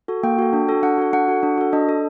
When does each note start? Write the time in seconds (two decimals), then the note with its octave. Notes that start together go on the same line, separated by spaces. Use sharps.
0.08 F#4 A4
0.23 A#3 G5
0.38 F#4 A4
0.53 D4
0.69 F#4 A4
0.83 D4 F#5
0.98 F#4 A4
1.13 D4 F#5
1.28 F#4 A4
1.43 D4
1.58 F#4 A4
1.73 D4 D#5
1.89 A4